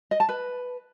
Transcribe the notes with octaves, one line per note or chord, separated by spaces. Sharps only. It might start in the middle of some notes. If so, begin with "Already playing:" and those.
D#5
A5
B4